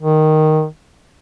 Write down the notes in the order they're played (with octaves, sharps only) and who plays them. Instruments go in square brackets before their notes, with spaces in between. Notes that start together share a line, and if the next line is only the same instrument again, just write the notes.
[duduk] D#3